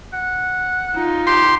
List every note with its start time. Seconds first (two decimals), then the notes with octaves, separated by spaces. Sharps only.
0.13 F#5
0.94 D#4 F4
1.27 G4 C6